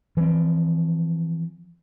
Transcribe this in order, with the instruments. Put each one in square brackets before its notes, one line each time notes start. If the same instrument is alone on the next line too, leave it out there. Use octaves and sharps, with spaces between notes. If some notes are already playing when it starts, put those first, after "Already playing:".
[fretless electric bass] E3 F3 A#3 C4